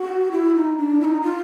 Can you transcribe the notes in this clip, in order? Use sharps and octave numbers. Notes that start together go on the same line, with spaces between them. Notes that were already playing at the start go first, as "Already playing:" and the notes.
Already playing: F#4
E4
D#4
D4
E4
D#4
F4